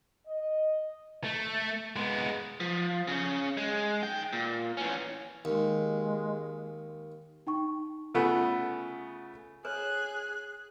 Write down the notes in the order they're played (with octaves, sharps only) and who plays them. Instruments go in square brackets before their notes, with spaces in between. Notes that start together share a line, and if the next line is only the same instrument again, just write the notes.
[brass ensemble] D#5
[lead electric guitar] A3
G#3 B3
F3
C#3 C#4
G#3
D#3 G5
A#2
E3 C#4
[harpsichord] D#2 [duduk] G#3
[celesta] D#4 G5 C#6
[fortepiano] C#3 A3 B3 [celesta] F4 F#5 B5
[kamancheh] G#4 F#6 [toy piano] B4 C#5